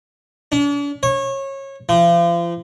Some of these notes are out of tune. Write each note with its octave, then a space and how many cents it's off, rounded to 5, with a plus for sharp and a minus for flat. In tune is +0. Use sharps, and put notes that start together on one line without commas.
D4 -45
C#5 -25
F3 -35